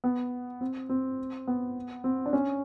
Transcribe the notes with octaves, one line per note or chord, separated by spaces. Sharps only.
B3
C4
C4
B3
C4
D4
C#4